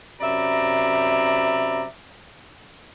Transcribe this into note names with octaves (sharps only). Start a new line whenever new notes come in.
F#2 C3 D5 E5 A#5 B5